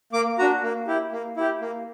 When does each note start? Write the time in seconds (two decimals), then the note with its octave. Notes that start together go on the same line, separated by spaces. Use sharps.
0.13 A#3 D6
0.39 D4 F#4 A#5
0.63 A#3
0.87 E4 G4
1.12 A#3
1.37 E4 G4
1.61 A#3